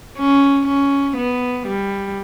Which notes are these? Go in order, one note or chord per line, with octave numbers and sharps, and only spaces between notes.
C#4
C#4
B3
G3